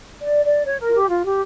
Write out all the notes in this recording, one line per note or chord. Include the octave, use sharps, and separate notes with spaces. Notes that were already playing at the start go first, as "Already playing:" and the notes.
D5
D5
C#5
A#4
F4
G4
F4
G4